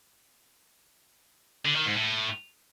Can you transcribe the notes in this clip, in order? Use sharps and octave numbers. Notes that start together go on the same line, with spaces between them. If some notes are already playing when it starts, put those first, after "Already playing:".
D3
D#3
G#2
A2